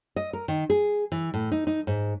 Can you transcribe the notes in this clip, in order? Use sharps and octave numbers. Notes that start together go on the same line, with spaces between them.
D#5
A#4
D#3
G#4
E3
A2
D#4
D#4
G#2